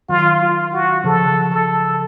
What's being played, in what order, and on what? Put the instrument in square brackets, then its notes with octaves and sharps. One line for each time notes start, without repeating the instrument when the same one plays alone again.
[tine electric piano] D#3 F#3 [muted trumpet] F4
[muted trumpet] F4
F#4
[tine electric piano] C#3 F3 [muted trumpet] A4
[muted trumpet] A4